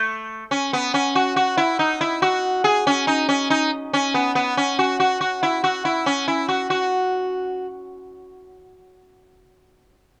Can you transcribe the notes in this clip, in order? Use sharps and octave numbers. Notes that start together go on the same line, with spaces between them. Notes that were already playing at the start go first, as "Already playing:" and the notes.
Already playing: A3
C#4
B3
C#4
F#4
F#4
E4
D#4
E4
F#4
G#4
C#4
D#4
C#4
D#4
C#4
B3
B3
C#4
F#4
F#4
F#4
E4
F#4
E4
C#4
E4
F#4
F#4